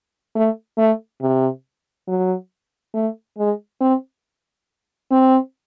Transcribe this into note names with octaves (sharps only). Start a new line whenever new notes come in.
A3
A3
C3
F#3
A3
G#3
C4
C4